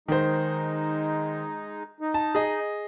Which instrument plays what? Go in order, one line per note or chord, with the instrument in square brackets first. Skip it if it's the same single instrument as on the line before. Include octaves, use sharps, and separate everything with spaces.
[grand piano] D#3 C5 [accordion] G#3 D#4
[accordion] D#4
[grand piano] A5
G#4 D#5